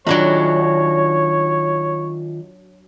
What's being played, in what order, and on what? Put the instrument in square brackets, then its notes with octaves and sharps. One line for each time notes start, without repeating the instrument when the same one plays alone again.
[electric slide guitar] D#3 F4 D#5 [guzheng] F#3 D4 B5 [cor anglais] C#5